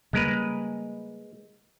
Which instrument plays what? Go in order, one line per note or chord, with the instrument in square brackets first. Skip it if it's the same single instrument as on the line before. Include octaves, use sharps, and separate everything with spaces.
[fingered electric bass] C#3 G3 A#3 [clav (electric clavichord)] G#3 A#4 B4